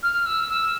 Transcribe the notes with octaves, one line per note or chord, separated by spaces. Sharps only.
F6
E6
E6